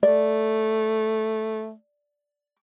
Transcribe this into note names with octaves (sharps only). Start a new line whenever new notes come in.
A3 D5